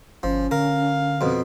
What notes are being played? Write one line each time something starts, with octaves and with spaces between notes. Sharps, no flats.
G1 F3 C#4
D3 A#4 F5
F2 B2